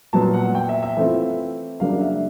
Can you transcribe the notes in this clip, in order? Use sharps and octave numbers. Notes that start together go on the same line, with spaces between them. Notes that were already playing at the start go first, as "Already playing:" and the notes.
A#2 F#3 B3 A5
F#5
G5
E5
E5
E3 A3 C4 F4
C#3 F#3 A#3 D4 F5
E5